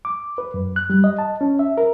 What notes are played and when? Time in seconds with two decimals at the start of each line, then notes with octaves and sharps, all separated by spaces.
0.05 D6
0.38 B4
0.54 F#2
0.76 F#6
0.90 G3
1.04 D#5
1.18 A5
1.41 C#4
1.59 E5
1.78 A#4